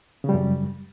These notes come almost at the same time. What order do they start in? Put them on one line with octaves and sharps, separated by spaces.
C#3 G3 F#2